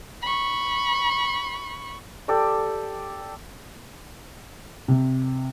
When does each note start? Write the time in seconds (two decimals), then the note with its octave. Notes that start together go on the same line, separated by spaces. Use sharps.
0.22 B5 C#6
2.28 G4 A4 D5
4.88 C3